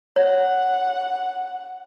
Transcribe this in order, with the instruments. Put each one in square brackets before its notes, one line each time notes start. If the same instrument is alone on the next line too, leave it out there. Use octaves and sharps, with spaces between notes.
[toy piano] C#5 [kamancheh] F#5